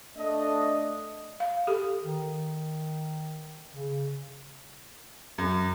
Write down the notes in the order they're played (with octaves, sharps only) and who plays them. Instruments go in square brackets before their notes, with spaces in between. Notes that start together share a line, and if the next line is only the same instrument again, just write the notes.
[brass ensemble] A3 D4 D#5
[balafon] F5
G4 A4
[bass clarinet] D#3
C#3
[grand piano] F#2